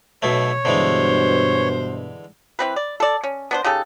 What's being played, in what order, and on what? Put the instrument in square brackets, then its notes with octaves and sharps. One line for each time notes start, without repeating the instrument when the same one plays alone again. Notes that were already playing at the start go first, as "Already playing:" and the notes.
[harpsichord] B1 B2 A3 [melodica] C#5
[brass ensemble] G2 B2 [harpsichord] D3 E3 G#3 [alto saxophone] C5
[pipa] E3 C4 B4
D5
A4 D5
C#4
B3 D4 C5
C#3 D#4 G4 A4